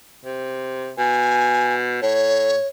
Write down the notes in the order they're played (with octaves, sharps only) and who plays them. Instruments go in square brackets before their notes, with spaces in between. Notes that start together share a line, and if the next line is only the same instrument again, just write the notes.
[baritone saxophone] C3
[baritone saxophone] B2 [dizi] G#5
[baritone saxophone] A2 [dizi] C#5